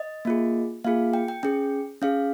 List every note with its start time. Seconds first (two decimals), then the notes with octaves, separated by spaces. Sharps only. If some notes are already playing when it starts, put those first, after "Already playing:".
Already playing: D#5
0.25 A#3 F4 G#4
0.84 A#3 F4 G#4 F5
1.14 G5
1.28 G5
1.43 C#4 G#4 G5
2.02 C#4 G#4 F5